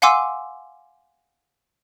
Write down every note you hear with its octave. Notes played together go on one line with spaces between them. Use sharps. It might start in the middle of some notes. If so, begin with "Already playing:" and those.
F5 F#5 G#5 C6 D6 E6